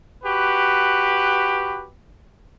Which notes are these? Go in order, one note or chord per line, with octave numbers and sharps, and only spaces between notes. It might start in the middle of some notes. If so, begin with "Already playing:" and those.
F#4 G4 B4